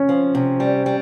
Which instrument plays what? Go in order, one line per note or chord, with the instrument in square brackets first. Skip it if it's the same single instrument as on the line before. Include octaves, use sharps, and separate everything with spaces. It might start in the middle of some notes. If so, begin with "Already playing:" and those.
Already playing: [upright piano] C#4
[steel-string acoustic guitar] F3
C3
G3
G3